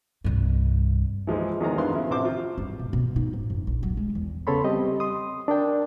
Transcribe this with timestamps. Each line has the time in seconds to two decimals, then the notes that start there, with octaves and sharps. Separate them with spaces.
0.24 C2 G2
1.27 E3 F3 G#3 D#4
1.60 E2 D#3 F3 G#3 A#3 A#5
1.78 G2 D#3 E4 B4 F5 C6
1.93 C#3 F3 E4
2.10 A1 C3 C5 D6
2.25 F4
2.58 G2
2.79 B2
2.93 B2
3.16 D#4
3.34 G#2
3.50 F2
3.67 A#1
3.83 F#3
3.97 G#3
4.15 E2
4.47 C#3 B3 A4 C#5 B5 C6
4.64 G3 C4 G4 D#5
5.00 C6 D#6
5.48 D4 A#4 G5 A5